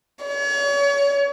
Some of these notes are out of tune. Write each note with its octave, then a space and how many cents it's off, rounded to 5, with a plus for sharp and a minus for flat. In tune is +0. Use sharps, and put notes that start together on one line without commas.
C#5 +35